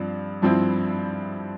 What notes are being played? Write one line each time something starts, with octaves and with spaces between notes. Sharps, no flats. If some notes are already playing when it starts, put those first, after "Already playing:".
Already playing: G2 F3 C4
G2 F3 C4 E4